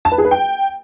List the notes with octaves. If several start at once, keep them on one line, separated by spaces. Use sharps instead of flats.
A5
B4
G#4
B4
G5